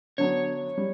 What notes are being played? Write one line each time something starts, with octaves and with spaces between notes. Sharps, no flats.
D3 F#3 B3 D4 C#5
G3